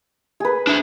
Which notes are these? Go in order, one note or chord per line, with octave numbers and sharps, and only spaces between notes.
G#4 B4
D4 E5